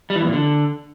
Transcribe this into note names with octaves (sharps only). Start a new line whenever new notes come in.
G3
E3
E2
A#2
D3